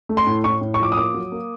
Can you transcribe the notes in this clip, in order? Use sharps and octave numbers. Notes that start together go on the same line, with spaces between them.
A3
C6
A2
A2 C#6
A2
C#6
F3 D6
D#6
A#3 D6
F#3
A#3